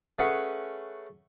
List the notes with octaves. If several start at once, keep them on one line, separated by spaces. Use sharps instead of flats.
A3 C#4 G#4 B4 F#5 C#6